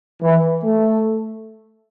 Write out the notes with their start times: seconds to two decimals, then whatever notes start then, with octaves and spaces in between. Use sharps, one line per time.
0.23 E3
0.63 A3